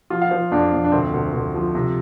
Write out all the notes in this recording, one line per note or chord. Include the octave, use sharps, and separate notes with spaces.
F3 F4
F5
F3 C5
F2 D4
F2
D4
D2 C4
D2
D2
F3
C3